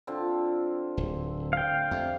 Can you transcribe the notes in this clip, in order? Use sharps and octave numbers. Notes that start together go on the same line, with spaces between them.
D3 C4 F4
D1
F5 G5
F2 C3